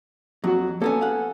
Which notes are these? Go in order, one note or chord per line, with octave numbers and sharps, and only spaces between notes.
F2 F#3 F#4
A#3 B3 C#4 A4 G#5
F5 F#5